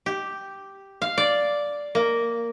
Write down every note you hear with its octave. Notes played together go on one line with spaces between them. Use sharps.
G4
F5
D5
A#3